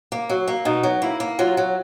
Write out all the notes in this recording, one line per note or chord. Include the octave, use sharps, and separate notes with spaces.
A#3
F#3
A#3
B2 D#4
F#3
A#3 E4
A#3
F#3 F4
F#3